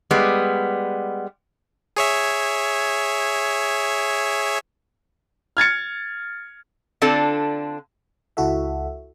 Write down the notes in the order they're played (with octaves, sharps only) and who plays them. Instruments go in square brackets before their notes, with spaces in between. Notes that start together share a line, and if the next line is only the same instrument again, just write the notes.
[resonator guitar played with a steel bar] G3 G#3 B3
[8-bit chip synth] G#4 C#5 E5
[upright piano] F6 G#6 A6 C#7
[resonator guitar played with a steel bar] D3 C4 D4 F4 A4
[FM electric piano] C#2 E4 F#4 A4 E5